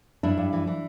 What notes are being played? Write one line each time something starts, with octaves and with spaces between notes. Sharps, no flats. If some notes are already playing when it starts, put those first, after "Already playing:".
G2 D4 E4
G2
E3
E3